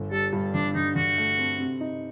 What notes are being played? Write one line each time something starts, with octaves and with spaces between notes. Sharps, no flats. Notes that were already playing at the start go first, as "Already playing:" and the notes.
Already playing: G1
G3 A4
G2
D3 D4
D3 D#4
D3 F#4
A3
C4
C3
D#4